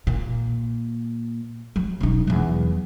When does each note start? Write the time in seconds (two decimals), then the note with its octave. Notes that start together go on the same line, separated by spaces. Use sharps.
0.07 A#2
1.76 F#3
2.01 E1 D#4
2.27 E2 F#3